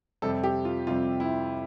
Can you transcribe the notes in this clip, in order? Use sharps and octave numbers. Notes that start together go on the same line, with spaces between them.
F2 C3 G3 C4 A4
G4
F4
F2 C3 G3 C4 F4
E4